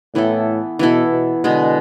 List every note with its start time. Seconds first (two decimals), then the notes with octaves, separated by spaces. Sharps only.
0.15 A2 E3 B3 E4 A4
0.79 B2 E3 B3 E4 A4
1.11 B2
1.44 B2 D3 G#3 B3